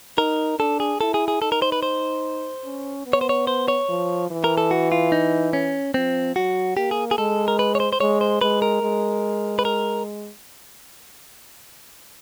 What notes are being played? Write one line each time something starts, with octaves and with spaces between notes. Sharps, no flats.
D#4 A#4
D4 A4
G#4
E4 A4
G#4
G#4
D#4 A4
A#4
C5
B4
C5
C#4
B3
C#5
C5
C#5
C5
C#5
F3
E3
A#4
A4
F#4
F4
D#4
C#4
F3 C4
F#3 F#4
A#3 G4
G#4
G#4
G#3 A4
A#4
B4
C#5
C5
C5
G#3 C#5
C5
G#3 B4
A#4
G#3
B4
A#4